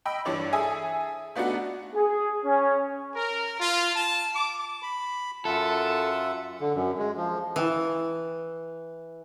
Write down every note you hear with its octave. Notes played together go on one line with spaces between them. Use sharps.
D#5 G5 B5 E6
G2 E3 D4 C#5 D5
G#4 A4 E5 G#5 D#6
A3 B3 D4 D#4 F#4
G#4
C#4
A#4
F4
A5
D6
B5
F#2 F4 A4 E5 F#5
D3
F#2
G#3
F3
E3 E4 G5 D#6